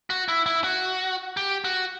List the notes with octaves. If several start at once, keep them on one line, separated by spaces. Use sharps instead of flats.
F#4
E4
E4
F#4
G4
F#4